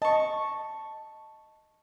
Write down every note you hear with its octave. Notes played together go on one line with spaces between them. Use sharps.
D#5 A5 C#6